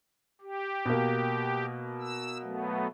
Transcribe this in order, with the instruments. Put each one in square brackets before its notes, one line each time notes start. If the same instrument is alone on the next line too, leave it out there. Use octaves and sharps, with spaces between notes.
[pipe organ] G4
[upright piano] B2 A#3
[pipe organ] E6
F#3 A3 B3